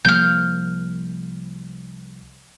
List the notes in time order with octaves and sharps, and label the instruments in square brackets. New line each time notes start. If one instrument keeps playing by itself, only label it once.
[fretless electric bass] C2 F3 A#3 [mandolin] F6 G6